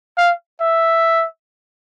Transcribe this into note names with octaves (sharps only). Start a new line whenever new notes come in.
F5
E5